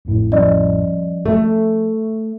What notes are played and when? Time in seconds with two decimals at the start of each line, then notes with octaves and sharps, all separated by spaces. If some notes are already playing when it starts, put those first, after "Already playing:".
0.05 A1 F2 A2
0.32 F3 G3 C#4 D5 D#5
1.26 A3 E5 C#6